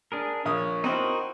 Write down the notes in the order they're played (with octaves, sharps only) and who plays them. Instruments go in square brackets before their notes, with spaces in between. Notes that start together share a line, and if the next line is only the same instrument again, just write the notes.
[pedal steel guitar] D4 G#4 A#4
[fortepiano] A#1 D#6 [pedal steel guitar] C#5
[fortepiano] C4 E4 [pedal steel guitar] D#4 F#4 A#4